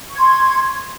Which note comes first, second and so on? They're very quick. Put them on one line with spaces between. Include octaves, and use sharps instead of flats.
C#6 G#6 C6